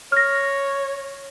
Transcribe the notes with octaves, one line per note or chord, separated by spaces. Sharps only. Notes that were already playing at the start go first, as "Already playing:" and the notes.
C#5 F6 A#6